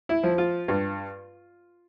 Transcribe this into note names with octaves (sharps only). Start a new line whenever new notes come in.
E4
F3
F4
G2